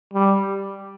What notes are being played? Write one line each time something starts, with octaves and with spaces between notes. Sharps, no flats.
G3